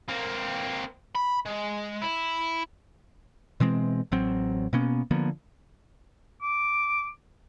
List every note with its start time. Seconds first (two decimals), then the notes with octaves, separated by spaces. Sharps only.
0.08 A#3 C4
1.15 B5
1.45 G#3
2.02 E4
3.60 B2 E3 G#3 C4
4.12 A1 F#3 C4
4.73 B2 A#3 B3 C#4
5.11 D3 F3 A#3 B3
6.42 D6